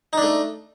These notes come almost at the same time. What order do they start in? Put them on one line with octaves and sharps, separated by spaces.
D#4 D4 A3